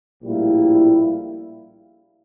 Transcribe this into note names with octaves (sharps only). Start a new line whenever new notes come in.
A#1 A2 G3 A#3 E4